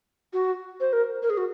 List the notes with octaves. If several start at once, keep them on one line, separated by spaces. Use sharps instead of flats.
F#4
C5
A#4
A#4
G#4
F#4